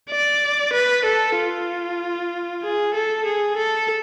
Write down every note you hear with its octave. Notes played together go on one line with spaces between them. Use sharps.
D5
B4
A4
F4
G#4
A4
G#4
A4